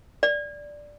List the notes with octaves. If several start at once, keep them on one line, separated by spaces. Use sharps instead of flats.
D5